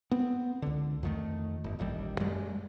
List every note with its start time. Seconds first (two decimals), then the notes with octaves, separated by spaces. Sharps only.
0.11 B3 C4
0.62 C#2 D3
1.03 F2 D#3 A3
1.64 G1
1.79 D#1 A1 D#2 G3
2.20 F#2 G3 G#3